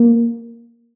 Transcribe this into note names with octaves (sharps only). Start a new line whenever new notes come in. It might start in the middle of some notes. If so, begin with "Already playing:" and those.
Already playing: A#3